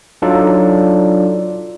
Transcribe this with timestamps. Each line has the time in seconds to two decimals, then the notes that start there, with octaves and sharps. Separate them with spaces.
0.22 F#3 D4 D#4 F4 A4 D5